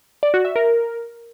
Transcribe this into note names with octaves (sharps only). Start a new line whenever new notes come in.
D5
F#4
E5
A#4